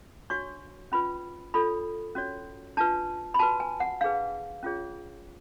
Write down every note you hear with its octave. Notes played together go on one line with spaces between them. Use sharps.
D4 F#4 C#5 C#6
C#4 F4 B4 B5
D4 F4 A4 C#5 B5
C#4 F#4 C#5
D4 F4 B4 A5
B5
F#4 B4 A5
G#5
F#5
D4 G#4 B4 F5
C#4 F4 G#4 C#5